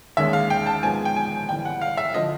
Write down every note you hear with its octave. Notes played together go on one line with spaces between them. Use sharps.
D#2 D#3 G#3 C#4 E5
F5
G5
A5
G#2 F3 G#3 B3 G#5
G5
G#5
G1 G2 E3 G5
F#5
F5
E5
D3 F3 D#5